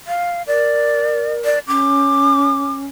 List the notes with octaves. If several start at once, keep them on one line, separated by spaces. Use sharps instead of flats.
F5
A#4 D5
D5
C#4 D6